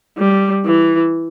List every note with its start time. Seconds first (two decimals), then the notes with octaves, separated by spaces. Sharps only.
0.18 G3
0.65 E3